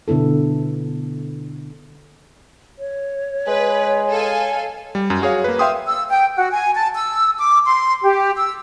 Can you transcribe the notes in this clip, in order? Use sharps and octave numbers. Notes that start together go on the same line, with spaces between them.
B2 D3 B3 E4 A4
C#5
G#3 B4
A4 F5 G#5
G3
F#2
F#4 G#4 C#5 F5
A#3 B4
E5 F5 G5 C6 D#6
E6
G5
F#4
G#5
A5
E6
D6
C6
G4
E6